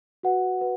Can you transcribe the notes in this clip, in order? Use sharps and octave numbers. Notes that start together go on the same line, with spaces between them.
F#4 B4 F#5
B4 F#5